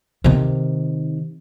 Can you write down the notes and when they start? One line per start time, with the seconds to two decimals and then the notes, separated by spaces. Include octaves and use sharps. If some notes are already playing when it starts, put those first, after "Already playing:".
0.24 C3 D#3